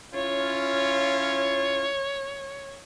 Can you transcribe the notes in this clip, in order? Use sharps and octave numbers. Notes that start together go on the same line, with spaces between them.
C#4 E4 F4 C#5